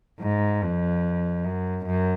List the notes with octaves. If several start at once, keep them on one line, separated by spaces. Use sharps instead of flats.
G#2
F2
F#2
F#2